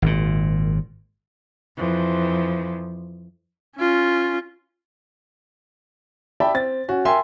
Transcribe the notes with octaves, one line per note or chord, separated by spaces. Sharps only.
G#1 A#2
F2 E3 F3
C#4 F4
D5 E5 G5 A5 B5
C4 A6
C#4 F#4
A#4 E5 G5 G#5 C6